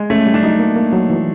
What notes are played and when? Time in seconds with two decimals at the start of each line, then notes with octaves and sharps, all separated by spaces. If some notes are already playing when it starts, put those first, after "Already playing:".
Already playing: G#3
0.10 A3 C#4
0.26 G3
0.34 D4
0.43 F#3 D#4
0.60 A#3
0.76 A#3
0.93 F#3
1.10 E3